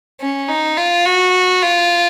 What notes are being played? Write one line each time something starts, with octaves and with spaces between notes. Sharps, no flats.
C#4
D#4
F4
F#4
F4